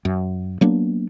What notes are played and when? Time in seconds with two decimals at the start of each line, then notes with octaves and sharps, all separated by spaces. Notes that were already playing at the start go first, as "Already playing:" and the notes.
0.05 F#2
0.61 F#3 A#3 B3 D4